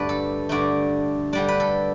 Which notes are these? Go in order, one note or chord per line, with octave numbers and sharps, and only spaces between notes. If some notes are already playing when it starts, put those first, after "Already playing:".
Already playing: G2 D3 A3 D4 B4 D5
A4
G2 D3 A3 D4 D5
D3 G3 D4 D5
B4
A4